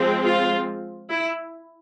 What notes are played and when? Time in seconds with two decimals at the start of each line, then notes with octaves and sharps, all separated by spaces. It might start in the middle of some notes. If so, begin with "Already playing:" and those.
Already playing: F3 G#3 C4
0.24 F4
1.10 E4